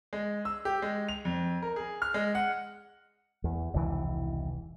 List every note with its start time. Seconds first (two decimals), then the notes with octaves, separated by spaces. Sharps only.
0.13 G#3
0.45 E6
0.65 G4
0.82 G#3
1.09 F7
1.25 F2
1.62 A#4
1.76 G#4
2.02 F6
2.14 G#3
2.35 F#5
3.44 E2
3.74 E1 C2 D#3 E3